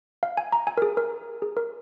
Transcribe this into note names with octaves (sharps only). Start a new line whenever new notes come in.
F5
G#5
A#5
G#5
A#4
G#4
A#4
G#4
A#4